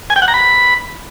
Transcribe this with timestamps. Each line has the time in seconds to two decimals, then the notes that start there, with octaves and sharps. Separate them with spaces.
0.10 G#5
0.16 G5
0.22 F#5
0.28 A#5
0.34 B5